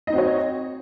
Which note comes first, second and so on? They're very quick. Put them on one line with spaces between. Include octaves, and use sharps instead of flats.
D#5 D#4 C4 F#4 C#5